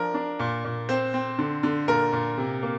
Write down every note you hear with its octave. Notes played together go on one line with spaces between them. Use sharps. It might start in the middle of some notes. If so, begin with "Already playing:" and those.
Already playing: F3 D4 A#4
D4
A#2
A#2
C4 C5
C4
D3
D3
A#2 A#4
A#2
C3
A#3